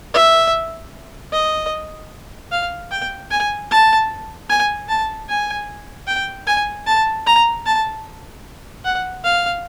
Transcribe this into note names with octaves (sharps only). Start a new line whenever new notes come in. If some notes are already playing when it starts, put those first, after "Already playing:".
E5
D#5
F5
G5
G#5
A5
G#5
A5
G#5
G5
G#5
A5
A#5
A5
F#5
F5